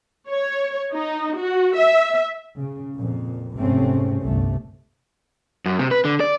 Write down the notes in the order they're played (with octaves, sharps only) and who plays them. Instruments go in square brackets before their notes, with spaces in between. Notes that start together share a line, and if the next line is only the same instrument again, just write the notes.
[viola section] C#5
D#4
F#4
E5
[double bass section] C#3
F2 A#2
F1 G#2 C3 A3 C4 C#4
G1 C2 A3
[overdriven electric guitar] F#2
C3
B4
D3
D5